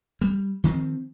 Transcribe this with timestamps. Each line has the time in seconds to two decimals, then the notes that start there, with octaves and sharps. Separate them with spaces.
0.21 G3
0.64 D#3 F3 C4